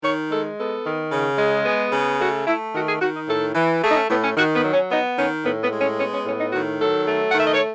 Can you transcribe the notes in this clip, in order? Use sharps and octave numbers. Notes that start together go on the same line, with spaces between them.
D#3 C#5
G#3 A4
B3 A4
D#3
C#3
G#3
B3 G#4
C#3
A3 F#4
A3 E4
D#3 F#4
G#4
D#3 F#4
D#4
A2 A4
E3
A3 G#4
D#4
C#4
A2 B3
C#4
D#3 F#4
B3
F#3
C#4
B3 D#4
D#3 C#4
A2 B3
B3
G#3
C#4
B3 C#4
C#4
A2 C#4
D#4
D#3 F#4
F#3 A4
A3
F#5
D#3 E5
D#5
C#5